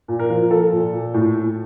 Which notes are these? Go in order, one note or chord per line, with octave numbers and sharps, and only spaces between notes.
A#2
A#4
F3
F3 A4
A#2
A#2
A2
A2